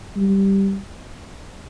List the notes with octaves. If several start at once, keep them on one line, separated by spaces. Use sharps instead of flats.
G3